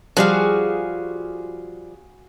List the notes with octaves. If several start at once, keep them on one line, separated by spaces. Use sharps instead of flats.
F3 G3 F#4 G#4 F5